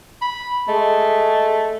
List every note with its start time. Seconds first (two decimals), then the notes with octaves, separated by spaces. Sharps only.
0.22 B5
0.68 G#3 A3